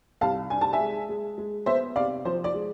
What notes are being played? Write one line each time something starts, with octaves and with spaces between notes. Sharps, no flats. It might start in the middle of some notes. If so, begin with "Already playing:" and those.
C2 F5 A5
D4 G#5
A5
E5 G#5
G#3
G#3
G#3
B3 C5 E5
C3 D5 F5
F3 C5
D5
G#3